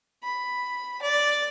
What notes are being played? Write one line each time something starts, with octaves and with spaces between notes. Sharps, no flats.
B5
D5